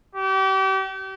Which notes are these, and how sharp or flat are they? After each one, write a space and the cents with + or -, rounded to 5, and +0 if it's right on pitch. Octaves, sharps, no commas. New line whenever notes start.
G4 -35